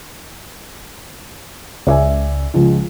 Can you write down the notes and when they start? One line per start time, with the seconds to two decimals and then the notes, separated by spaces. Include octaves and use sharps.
1.87 C#2 D5 E5 G#5
2.54 C#2 F3 G#3